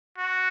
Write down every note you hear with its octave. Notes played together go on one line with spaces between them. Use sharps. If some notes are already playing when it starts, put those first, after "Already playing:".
F#4